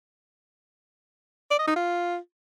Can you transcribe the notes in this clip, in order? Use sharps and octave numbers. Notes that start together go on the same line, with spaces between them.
D5
D#5
D#4
F4